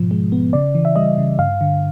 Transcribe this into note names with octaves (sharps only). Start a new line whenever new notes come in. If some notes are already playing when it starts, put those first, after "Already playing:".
Already playing: G#2 B2 F3
G#3
B3
C#3 D5
E3
E5
G3 D#5
C#3
G2 F5
D3